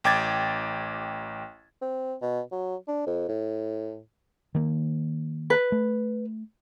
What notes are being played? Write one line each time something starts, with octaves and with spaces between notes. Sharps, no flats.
A1 G5 D6 G#6 A6
C4
B2
F#3
D4
F2
A2
D#3 A#3
B4
A3